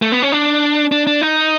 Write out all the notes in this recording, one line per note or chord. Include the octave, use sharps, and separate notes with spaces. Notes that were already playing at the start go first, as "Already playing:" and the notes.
A3
B3
C#4
D4
D4
D4
D#4